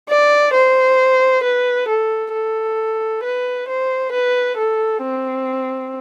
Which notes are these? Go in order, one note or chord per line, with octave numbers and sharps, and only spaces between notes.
D5
C5
B4
A4
A4
B4
C5
B4
A4
C4